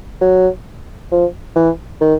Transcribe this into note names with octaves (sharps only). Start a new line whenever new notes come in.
F#3
F3
E3
D#3